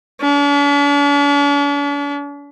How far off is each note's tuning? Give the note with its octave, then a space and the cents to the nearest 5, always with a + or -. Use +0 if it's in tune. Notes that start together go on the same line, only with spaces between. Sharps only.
D4 -45